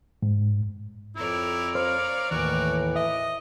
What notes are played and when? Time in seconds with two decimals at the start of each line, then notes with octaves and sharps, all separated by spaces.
0.22 G#2
1.16 F2 E4 A#4 C#5 D5
1.75 C5 F5
2.31 D#2 A2 E3 F#4
2.96 D#5 E5